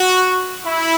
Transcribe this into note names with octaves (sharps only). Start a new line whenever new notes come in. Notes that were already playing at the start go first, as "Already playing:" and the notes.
Already playing: F#4
E4